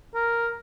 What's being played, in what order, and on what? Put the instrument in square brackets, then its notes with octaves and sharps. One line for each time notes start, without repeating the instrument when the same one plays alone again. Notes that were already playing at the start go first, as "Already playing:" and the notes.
[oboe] A#4